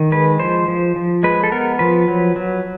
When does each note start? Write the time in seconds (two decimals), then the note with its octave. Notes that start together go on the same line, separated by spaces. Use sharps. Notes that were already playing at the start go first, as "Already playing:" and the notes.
Already playing: D#3
0.12 G#3 B4
0.40 F3 C5
0.68 F3
0.96 F3
1.23 G#3 B4
1.44 A4
1.52 B3 A#4
1.79 F3 B4
2.08 F#3
2.36 F#3